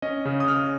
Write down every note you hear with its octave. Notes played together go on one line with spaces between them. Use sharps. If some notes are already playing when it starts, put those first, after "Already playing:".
C#4 D#5
C#3
D#6
C#3 F6